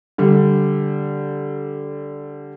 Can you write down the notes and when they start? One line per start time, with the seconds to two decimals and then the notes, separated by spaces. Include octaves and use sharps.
0.18 D3 G3